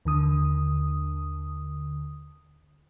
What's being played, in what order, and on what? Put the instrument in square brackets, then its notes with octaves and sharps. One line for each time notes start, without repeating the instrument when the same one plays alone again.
[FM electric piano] D#2 D3 D#6